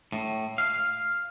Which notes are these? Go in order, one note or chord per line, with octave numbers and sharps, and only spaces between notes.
A2
F5